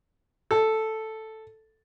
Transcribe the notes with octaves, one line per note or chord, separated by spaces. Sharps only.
A4